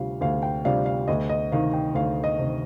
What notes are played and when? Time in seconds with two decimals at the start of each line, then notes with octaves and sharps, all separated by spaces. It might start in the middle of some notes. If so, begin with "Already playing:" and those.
Already playing: D2 C3 G3 D4 F4 F5
0.21 D2 F5
0.43 G5
0.65 C3 G3 D4 F4 F5
0.86 F5
1.08 D2 D#5
1.29 D#5
1.51 C3 D#3 F5
1.73 G5
1.95 D2 F5
2.24 D#5
2.39 C3 D#3